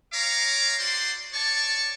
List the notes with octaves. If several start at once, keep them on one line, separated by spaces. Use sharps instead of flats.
C#5 F5 A#5 D6
F#4 C5 D5 C6
C#5 D5 A5 C#6